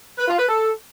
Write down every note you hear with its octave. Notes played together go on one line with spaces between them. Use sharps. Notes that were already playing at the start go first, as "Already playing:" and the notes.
B4
F4
B4
A4